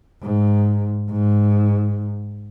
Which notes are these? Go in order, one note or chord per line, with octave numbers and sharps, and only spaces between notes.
G#2
G#2